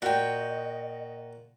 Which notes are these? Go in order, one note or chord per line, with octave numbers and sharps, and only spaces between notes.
A#2 F#4 D#5 G5